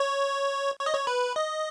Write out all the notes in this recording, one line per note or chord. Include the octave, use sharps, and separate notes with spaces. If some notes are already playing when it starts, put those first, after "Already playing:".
Already playing: C#5
C#5
D#5
C#5
B4
D#5